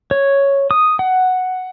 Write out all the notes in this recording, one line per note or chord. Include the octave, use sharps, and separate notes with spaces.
C#5
D#6
F#5